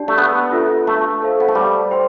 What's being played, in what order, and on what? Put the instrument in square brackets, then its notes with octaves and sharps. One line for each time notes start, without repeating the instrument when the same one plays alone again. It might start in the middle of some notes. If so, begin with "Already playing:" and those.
Already playing: [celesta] D4 G4 D5 A5
[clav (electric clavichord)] A3
B3
[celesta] D4 F4 A4 E5
[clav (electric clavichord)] A3
[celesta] A4 C5 F5
[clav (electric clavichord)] B3
A3
G3
[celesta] C5 G5 C6